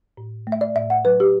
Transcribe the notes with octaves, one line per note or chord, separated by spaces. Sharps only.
A2
A3
E5
D5
A2 E5
F#5
F#3 B4
G4